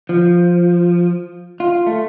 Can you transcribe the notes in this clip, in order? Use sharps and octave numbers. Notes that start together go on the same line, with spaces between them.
F3
F4
A3